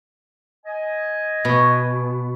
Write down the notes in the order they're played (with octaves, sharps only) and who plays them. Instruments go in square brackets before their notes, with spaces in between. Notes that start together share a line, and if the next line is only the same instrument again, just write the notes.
[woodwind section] D#5 G#5
[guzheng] B2